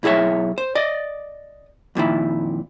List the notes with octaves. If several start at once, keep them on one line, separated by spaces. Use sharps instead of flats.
B1 E4 G#4 C#5 E5
C5
D5 D#5
F2 A#2 D#3 E4